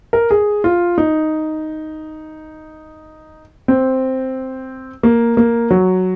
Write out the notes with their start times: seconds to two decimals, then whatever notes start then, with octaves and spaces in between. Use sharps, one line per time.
0.13 A#4
0.31 G#4
0.64 F4
0.98 D#4
3.68 C4
5.03 A#3
5.37 A#3
5.71 F#3